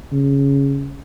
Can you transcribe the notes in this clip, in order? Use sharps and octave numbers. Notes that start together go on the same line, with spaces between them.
C#3